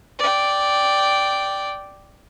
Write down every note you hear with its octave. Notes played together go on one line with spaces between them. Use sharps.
D5 G5